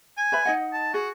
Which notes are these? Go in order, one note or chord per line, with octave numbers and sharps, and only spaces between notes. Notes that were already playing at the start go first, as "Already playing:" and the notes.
G#5
B4 E5 B5
D#4 D#5 F#5
A5
F#4 G#4